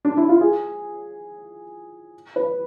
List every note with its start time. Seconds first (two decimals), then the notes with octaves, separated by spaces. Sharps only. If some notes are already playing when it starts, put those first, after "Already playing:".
0.05 D4
0.17 E4
0.29 F4
0.41 G#4
2.36 B4